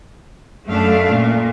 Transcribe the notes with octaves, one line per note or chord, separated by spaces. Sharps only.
F#2 A3 D4 F5
A#2